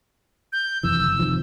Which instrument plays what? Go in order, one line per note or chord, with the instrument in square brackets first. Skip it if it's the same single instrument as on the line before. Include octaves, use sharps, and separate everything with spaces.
[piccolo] G6
[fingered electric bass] F2 C3 E3 [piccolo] E6
[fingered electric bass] F#1
C3 D#3 F3